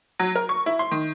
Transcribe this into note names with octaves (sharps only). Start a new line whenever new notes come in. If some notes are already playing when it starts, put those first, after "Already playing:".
F#3
A#4
C#6
E4
C6
D#3